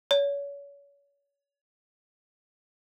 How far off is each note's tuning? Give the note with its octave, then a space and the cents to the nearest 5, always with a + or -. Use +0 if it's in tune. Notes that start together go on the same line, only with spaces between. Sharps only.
C#5 +35